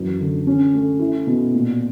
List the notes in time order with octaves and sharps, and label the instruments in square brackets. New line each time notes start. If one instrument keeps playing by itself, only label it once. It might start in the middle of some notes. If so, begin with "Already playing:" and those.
Already playing: [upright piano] F#2 E3
D3
C#4
A3
E4
B2
A#2